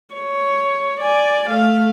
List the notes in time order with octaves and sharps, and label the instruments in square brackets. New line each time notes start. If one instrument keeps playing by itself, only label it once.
[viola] C#5
D5 G#5
A3 F5